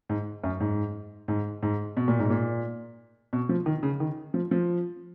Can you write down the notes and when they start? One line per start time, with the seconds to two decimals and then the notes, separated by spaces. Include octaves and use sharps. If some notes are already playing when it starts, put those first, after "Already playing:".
0.09 G#2
0.44 F#2
0.60 G#2
1.28 G#2
1.62 G#2
1.97 B2
2.08 A#2
2.19 G#2
2.30 A#2
3.33 B2
3.49 F3
3.66 D#3
3.83 C#3
4.00 D#3
4.34 F3
4.51 F3